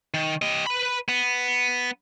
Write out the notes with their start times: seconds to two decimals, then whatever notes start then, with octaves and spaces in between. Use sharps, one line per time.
0.14 D#3
0.42 G4 D#5
0.67 B4 B5
1.09 B3